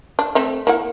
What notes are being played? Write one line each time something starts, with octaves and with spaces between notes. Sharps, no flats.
D4
A3 C4 E5
A#3 E4 F#5